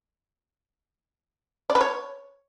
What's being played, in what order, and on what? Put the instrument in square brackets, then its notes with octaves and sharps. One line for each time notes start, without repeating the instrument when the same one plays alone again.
[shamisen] D5
B4
C#5